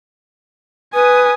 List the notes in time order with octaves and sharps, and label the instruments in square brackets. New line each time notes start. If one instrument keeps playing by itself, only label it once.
[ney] B4 [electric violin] G#5 D#6